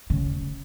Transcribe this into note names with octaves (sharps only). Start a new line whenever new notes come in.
C#3